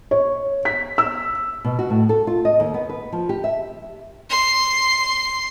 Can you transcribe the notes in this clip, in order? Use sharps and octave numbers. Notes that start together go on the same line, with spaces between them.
C#5
B6
E6
B2
F#4
A2
A4
F4
D#5
D#2
B3
B4
F3
G4
E5
C6